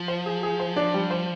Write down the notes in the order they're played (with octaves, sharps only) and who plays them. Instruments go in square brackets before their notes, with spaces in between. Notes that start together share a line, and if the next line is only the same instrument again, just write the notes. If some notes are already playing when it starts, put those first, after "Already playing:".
Already playing: [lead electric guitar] F3
[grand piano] C5
G#4
G#4
C5
D4
G3
C5